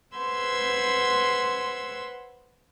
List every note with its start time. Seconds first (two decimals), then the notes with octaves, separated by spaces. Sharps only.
0.17 B4 C5 F#5 C6 E6 G#6